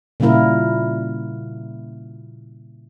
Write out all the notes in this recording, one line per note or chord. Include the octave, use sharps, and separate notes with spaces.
A#2 C#3 G3 A#3 E4 A#4